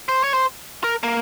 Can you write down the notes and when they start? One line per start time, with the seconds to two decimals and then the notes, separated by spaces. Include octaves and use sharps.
0.09 C5
0.24 C#5
0.34 C5
0.84 A#4
1.03 A#3